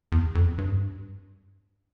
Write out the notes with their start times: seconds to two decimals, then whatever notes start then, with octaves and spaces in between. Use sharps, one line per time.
0.12 E2
0.35 F2
0.58 G2